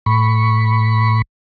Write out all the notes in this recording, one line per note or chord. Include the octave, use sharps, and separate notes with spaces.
A2 B5 C#6